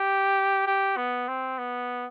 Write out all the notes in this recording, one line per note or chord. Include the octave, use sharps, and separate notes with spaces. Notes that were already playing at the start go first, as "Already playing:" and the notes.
Already playing: G4
G4
B3
C4
B3